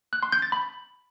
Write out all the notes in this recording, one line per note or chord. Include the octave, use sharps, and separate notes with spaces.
F#6
C6
G6
A6
B5